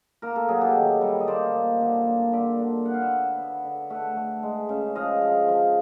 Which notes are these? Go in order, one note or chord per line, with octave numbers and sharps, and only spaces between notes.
A#3 A#4
A4
F#3 G#4
G4 A4
D#3
G3
D#5
A#3 C5 D5
A#2
D3
A#3
D3 D5 E5
D3
B3 F#5
F5
E5 F#5
B3
B3
D3
A3 E5 F#5
A3
G#3
C#3
F3 D#5 F5
F3
F3